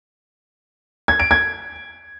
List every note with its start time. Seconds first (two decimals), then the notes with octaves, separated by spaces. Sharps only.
1.08 G#6
1.20 D7
1.31 G#6